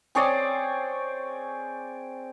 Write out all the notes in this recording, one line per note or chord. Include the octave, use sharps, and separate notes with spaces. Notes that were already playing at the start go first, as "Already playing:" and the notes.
C4 G#4 C#5 D5